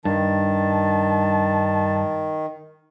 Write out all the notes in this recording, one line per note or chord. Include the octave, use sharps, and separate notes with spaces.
G2 D#3 A5